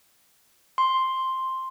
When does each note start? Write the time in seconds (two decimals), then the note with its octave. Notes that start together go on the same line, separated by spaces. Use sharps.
0.78 C6